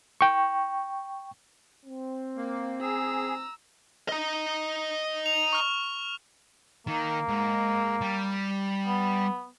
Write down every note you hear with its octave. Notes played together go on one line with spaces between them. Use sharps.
G5 C#6
C4
A#3
G#4 A#5 E6
D#5 A#5
F7
C#6 F6
D#3 A#3
G#2
G3
B3